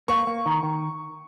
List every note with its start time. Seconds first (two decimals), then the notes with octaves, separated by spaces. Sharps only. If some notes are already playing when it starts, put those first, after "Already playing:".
0.08 A#3 C#6
0.27 A#3
0.46 D#3
0.63 D#3